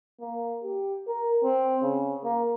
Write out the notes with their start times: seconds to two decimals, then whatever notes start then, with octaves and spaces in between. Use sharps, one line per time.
0.21 A#3
0.63 G4
1.08 A#4
1.44 C4
1.83 C#3
2.24 A#3